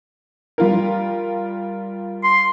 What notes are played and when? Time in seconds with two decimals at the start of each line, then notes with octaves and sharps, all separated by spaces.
0.58 G3 F4 A#4
2.24 C6